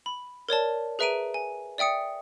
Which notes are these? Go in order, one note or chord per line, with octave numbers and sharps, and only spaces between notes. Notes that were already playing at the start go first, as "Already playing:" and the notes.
B5
A#4 C#5 D5 A5
G#4 B4 E5 A#5 D7 D#7
G#5
D5 E5 G5 D#6 C#7